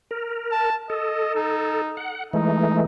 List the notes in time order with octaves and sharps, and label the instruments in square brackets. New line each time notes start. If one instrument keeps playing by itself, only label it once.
[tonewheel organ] A#4
[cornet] A5
[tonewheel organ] A4 [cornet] D#5
[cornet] D#4
[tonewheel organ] F#5
[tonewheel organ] E3 G#3 A3 [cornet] D#4